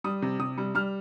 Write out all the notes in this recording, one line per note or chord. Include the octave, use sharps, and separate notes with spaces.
G3 D#6
C3
C3 D#6
G3
G3 F6